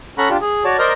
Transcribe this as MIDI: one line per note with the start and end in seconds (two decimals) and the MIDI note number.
0.18 0.29 61
0.18 0.29 69
0.18 0.29 78
0.18 0.29 82
0.18 0.29 83
0.18 0.29 85
0.30 0.37 62
0.30 0.37 65
0.30 0.37 67
0.41 0.63 68
0.64 0.77 66
0.64 0.77 73
0.64 0.77 74
0.64 0.77 81
0.79 0.93 70
0.79 0.93 72
0.79 0.93 74
0.79 0.93 75
0.79 0.93 82
0.79 0.93 89